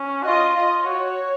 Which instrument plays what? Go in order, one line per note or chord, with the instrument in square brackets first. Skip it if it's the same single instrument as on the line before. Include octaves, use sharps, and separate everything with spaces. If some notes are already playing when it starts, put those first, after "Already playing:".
Already playing: [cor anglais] C#4
F#4
[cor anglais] F4 [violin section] D#5
[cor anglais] F4 [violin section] D#5
[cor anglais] F#4 [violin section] C#5